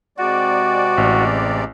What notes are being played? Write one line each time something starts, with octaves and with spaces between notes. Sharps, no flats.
C3 G#3 F#4 D5
A1